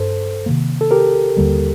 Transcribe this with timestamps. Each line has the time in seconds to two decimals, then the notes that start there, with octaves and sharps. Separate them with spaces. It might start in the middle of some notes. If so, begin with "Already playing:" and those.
Already playing: G2 A4 C5
0.46 C3 D#3 A#3
0.81 A4
0.91 G4 A#4
1.37 D#2 D3 G3 A#3